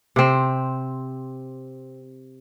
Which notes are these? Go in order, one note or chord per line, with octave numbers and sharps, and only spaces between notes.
C3 C4